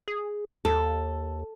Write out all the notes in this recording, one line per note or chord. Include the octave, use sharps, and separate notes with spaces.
G#4
D#2 A4